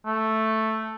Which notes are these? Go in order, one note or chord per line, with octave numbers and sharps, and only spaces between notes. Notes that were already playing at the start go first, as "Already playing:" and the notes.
A3